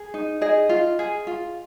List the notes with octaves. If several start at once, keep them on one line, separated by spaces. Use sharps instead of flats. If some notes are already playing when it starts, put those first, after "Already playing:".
Already playing: G#4
D#4
G#4 D#5
F4
G#4
F4